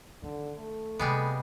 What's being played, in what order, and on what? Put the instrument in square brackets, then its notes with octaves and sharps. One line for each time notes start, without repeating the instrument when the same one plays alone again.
[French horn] D3 [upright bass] D#3
[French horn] A3
[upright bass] C3 [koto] G3 G#3 B3